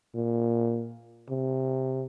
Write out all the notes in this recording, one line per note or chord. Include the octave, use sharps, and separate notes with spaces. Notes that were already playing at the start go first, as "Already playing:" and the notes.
A#2
C3